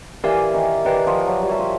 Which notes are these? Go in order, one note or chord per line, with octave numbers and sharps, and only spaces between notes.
E3 G4 A#4 D5 F5 G#5
D#3
D#3 G4 B4 D5 G5
F3
F#3
G3
F#3 F#4 A#4 C#5 E5 A5
F3